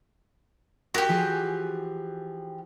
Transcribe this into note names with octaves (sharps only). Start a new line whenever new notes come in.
F#4 G4 A#4
E3 F3 G#4